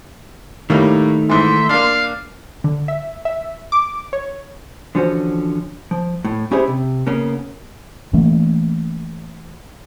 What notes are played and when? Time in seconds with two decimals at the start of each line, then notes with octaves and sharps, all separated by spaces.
0.70 A2 D#3 G3 A3 A#3 D#4
1.29 G#2 E3 E5 C6
1.69 A#3 D4 F5
2.64 D3
2.88 E5
3.25 E5
3.72 D6
4.13 C#5
4.95 D3 E3 F3 C#4 F#4 C5
5.91 F3
6.25 A2
6.52 C#4 E4 G4 G#4 C5 C#5
6.67 C3
7.07 C#3 A#3 B3 C#4 A#4
8.13 E3 A3 A#3 C#4